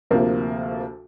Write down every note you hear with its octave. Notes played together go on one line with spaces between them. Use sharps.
D2 C3 F3 A#3